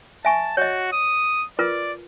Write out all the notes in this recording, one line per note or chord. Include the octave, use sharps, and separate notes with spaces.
E5 G#5 A5 C#6
F#4 C#5 D#5
D#6
F4 A#4 B4 D5